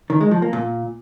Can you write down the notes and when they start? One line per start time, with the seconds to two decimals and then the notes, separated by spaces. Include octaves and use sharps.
0.10 D#3
0.21 G#3
0.31 F3
0.42 A#3
0.53 A#2